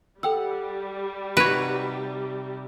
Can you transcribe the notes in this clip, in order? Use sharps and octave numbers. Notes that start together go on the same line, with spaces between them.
G3 A4 F#5 G5 E6
C3 D#4 F#4 B4 C#5 F#6 A#6 D7